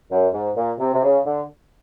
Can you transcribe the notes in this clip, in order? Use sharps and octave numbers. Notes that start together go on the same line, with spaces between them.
F#2
G#2
A#2
C3
C3
C#3
D3